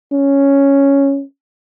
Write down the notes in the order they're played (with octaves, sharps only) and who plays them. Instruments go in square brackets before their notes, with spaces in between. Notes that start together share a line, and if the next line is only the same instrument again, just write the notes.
[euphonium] C#4